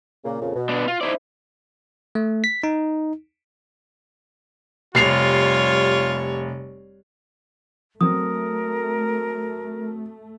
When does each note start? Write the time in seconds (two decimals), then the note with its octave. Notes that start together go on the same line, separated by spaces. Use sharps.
0.25 A#2 C#3 A#3
0.41 F2 A#2 C#3
0.55 B2
0.69 B3 D4
0.88 F4
1.01 D#4 E4 C5 D5 E5
2.15 A3
2.44 B6
2.63 D#4
4.95 F1 G3 F4 C#5 C7 F7
8.01 F#3 A3 C4 A#4 D#6